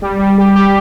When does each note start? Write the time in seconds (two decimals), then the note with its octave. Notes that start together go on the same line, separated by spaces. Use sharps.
0.02 G3
0.19 G3
0.38 G4
0.56 G4